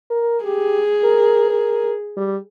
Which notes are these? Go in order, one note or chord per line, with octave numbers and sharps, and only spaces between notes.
A#4
G4 G#4
A#4
A#4
G3